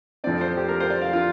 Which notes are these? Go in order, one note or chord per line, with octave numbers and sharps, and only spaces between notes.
F2 F3 C4 D5
C5
G4
A#4
C5
D5
F5
F4